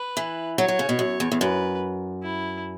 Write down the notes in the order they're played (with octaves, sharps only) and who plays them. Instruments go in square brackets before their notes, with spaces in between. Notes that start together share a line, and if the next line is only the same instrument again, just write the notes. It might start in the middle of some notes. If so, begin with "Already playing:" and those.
Already playing: [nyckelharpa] B4
[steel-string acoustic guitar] E3
[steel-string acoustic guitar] F#3 [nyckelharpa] C#5
[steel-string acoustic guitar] F#3
C#3
B2
F#2
E2
E2
[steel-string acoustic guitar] F#2 [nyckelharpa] B4
[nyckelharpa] E4